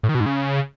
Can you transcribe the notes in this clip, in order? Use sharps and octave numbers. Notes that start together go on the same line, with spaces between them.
A2
D#3
B2
G#2
C#3